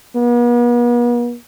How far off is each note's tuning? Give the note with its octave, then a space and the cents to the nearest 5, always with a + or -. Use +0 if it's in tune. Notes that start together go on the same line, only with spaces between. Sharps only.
B3 -45